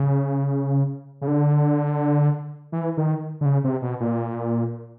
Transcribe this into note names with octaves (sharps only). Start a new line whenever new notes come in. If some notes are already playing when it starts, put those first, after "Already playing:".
Already playing: C#3
C#3
D3
E3
D#3
D3
C#3
C3
B2
A#2